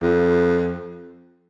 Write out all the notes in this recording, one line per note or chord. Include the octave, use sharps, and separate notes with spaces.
F2